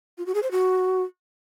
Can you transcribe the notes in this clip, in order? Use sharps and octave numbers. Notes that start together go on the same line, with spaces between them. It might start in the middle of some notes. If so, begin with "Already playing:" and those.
F4
F#4
G#4
C5
F#4